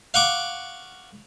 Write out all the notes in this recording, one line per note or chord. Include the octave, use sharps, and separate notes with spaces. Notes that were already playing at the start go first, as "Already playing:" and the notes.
F5 F#5 C#6 D6